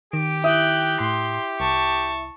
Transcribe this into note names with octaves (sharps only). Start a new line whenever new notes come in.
D#3 G4 D7
E4 E5 G5 D#6 F#6
A2 C6
C2 A5 C#6